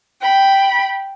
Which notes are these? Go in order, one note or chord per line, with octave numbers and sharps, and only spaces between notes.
G5 B5